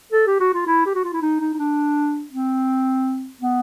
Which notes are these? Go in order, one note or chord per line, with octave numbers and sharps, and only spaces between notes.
A4
G4
F#4
F4
E4
G4
F#4
F4
E4
D#4
D#4
D#4
D4
C4
B3